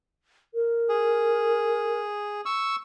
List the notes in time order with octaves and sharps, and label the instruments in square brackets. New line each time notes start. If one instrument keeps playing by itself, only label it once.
[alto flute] A#4
[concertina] G#4
C#6 E6